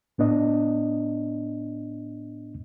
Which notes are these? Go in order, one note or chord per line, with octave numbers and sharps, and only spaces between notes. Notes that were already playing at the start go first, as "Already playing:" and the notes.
A2 B3 D4 D#5